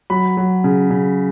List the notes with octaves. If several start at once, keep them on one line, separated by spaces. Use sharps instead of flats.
F#3 B5
F#3
C#3
C#3